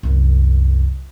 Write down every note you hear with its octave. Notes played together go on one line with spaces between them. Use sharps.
C2 F#2